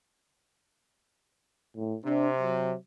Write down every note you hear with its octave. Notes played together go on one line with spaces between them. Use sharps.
A2
C3 D4
F#3